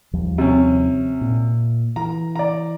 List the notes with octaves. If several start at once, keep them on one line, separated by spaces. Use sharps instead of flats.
D#2 F3 G3
C3 C#4
A#2
E3 A#5
D5 A#5